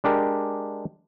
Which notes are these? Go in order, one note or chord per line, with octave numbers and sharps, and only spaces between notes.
G#3 D4 G4 A#4